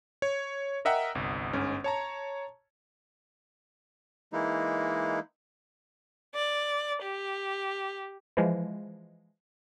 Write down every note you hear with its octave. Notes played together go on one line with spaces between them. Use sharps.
C#5
A#4 D#5 E5 F#5 G5 A#5
G1 C2
G1 G#2 C#4
C#5 A5 A#5
E3 G#3 A#3 D#4 E4
D5
G4
E3 F3 G#3